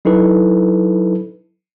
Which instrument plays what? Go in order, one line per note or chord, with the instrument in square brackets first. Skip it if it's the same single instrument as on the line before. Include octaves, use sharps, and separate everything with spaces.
[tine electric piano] F#3 D#4 E4 A4 B4